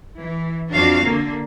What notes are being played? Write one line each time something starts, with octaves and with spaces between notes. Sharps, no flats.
E3
F2 D4 F#4 F5
D3 A#3